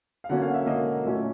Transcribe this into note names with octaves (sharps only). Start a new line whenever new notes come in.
F5
D3 F#3 A#3 C#4 F#5
F5
E5
D3 F#3 A#3 C#4 D#5
A#2 F#3 A3 C#4